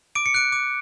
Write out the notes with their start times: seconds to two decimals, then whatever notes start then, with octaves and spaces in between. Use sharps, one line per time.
0.15 D6 D7
0.26 C#7
0.34 F#6 D7
0.52 D6